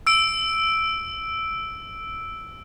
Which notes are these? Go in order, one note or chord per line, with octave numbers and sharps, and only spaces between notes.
E6 D7